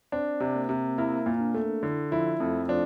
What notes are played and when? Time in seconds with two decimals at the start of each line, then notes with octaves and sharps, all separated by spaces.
0.12 C4 D4 C5
0.40 C3
0.55 A#3 A#4
0.69 C3
0.98 A#3 E4 A#4
1.26 A#2
1.40 D4
1.54 A3
1.83 D3 E4
2.12 F3 E4 F4
2.40 F2 A3 A4
2.69 F3 D4 F4